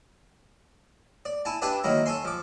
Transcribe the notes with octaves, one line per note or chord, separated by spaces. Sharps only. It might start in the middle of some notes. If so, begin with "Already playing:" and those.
D5
E4 G#5 A5
D4 G4 B4 E5 G#5 A5
D#3 F#3 A#3 E4
A4 C#5 G#5 C6
F3 D6